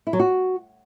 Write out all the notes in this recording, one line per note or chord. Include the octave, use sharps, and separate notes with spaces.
E4
F#3
F#4